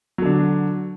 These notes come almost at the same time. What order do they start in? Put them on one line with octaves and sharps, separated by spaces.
F#3 D3 D4